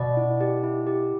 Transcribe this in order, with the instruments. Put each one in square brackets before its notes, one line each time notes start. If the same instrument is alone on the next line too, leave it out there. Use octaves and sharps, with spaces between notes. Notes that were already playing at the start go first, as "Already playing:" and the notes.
Already playing: [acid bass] B2 [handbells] D5
[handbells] E4
G4
E4
G4